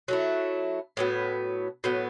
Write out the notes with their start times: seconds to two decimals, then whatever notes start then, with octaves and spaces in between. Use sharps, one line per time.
0.08 F#3 A3 E4
0.97 A2 F#3 B3
1.84 A2 F#3 B3